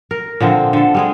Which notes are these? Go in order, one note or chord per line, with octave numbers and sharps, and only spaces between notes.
A#4
A#2 D3 F3 C4
D3 A4
G3 G#3 G#4